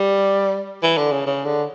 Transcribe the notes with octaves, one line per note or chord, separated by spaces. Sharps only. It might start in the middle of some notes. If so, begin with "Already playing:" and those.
Already playing: G3
E3
D3
C#3
C#3
D3